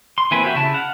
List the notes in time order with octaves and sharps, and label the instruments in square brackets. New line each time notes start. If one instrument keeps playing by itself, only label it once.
[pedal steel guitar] C6
E3 A#3 C4 G#5 B5
F#4 G4 E5
C#3 E4 A5
F5 F#5